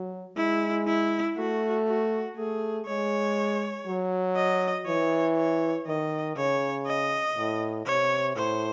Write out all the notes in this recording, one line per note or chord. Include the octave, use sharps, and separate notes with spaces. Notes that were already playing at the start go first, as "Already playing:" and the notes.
Already playing: F#3
G#3 E4
E4
A3 F#4
F#4
A3 G#4
G#3 C#5
F#3
D#5
E3 C#5
C#5
D#3 D#5
C#3 C#5
D#5
A2
C3 C#5
A2 C5